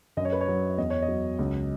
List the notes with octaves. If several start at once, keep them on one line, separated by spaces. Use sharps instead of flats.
F#2 D#5
C#5
B4
C#5
F#3
E2 D#5
C#5
D#5
F#3
C#2